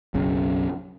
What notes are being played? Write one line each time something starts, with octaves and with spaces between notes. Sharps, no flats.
F#1 B1 C#3